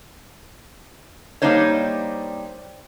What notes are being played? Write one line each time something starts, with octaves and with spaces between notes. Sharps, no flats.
G3 A#3 D4 D#4 C5 C#5